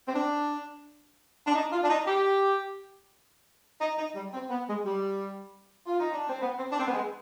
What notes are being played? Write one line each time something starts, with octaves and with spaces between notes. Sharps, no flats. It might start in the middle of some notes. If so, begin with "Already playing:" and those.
C4
D4
D4
D#4
F4
D4
D#4
G4
D#4
D#4
G3
C4
B3
G#3
G3
F4
D#4
D4
C4
B3
C4
D4
C4
B3
G#3